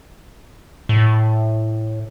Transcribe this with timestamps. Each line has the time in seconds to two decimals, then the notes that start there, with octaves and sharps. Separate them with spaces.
0.89 A2